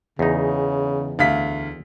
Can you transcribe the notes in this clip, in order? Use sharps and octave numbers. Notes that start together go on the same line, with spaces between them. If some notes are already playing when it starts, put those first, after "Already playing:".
E2 C#3 D#4
D2 F5 B6